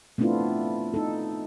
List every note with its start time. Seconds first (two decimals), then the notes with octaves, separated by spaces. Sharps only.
0.18 A3 B3 C4 D4 E4 F4
0.94 D#4 A4